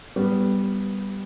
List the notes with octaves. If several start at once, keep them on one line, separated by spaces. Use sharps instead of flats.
G3 B3